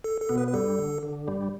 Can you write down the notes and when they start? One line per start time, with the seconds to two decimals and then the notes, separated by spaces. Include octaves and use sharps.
0.04 A4
0.21 A4
0.29 B2 B3
0.38 B4
0.48 B4
0.53 G2 G3 A4
0.79 D3
1.03 D3
1.27 G2 G3